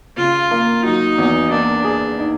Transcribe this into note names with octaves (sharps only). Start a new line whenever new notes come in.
C#3 F4
A#3
F#3 D#4
E2
A#3 D4
G#4
D#4